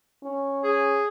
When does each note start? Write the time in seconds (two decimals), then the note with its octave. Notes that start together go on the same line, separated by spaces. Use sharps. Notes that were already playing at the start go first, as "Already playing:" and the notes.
0.24 C#4
0.64 G#4